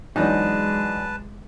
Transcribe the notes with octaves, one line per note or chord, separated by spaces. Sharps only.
E2 F#3 G#3 D4 D#4 B4 A5